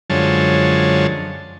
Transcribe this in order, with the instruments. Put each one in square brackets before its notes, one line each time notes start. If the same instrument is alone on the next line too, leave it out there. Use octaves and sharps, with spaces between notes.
[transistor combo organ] F#2 D3 F3 G#3 C#5 A5